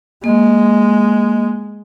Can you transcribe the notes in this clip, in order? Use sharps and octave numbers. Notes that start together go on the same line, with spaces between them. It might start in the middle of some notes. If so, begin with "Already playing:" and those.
G#3 A#3 D#5